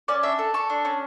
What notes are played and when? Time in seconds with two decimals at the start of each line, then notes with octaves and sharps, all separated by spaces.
0.08 C#4 D5
0.23 D4 E5
0.39 A4
0.54 A4 C#6
0.70 D4
0.85 C#4